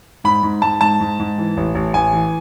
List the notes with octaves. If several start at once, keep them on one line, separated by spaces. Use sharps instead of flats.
G#2 B5
G#2
G#2 A5
G#2 A5
G#2
G#2
E3
A1
A1
A1 G#5
E3